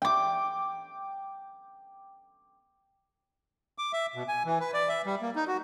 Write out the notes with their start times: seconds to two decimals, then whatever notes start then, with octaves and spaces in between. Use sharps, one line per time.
0.02 G5 D6
3.78 D6
3.93 E5
4.15 B2
4.28 G#5
4.45 E3
4.60 B4
4.74 D5
4.89 E5
5.06 G3
5.21 A#3
5.36 D#4
5.48 F#4